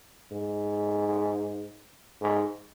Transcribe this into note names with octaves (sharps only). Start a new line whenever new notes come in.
G#2
G#2